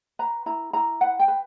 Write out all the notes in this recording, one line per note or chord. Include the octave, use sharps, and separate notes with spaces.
B4 A#5
E4 A#5
E4 A#5
B4 F#5
G5
B4